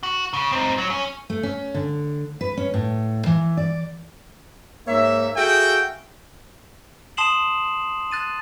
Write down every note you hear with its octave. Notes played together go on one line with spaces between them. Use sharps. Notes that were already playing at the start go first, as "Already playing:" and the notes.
F#4
C#3
C4 D#4
F#3
C#4
A3
C#4
D3
B4
C#4
A2
E3
D5
G#2 A#3 C#5 E5
F#4 G#4 A4 E5 F5 G5
A5 C6 D#6 C7 E7 F#7
F#6 A6 D#7